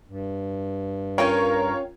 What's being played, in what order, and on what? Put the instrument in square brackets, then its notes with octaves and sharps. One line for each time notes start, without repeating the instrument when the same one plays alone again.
[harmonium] G2
[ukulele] C#4 G5 [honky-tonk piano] F4 C#5 [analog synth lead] A#4